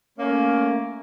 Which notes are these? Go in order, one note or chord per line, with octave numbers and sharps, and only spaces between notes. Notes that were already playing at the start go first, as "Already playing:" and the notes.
A3 A#3 C#4